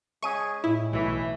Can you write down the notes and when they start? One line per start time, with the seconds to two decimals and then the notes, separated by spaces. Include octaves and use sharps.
0.22 G#3 C#4 G#4 C#6 D#7
0.64 A2 E4
0.93 B1 E3 A3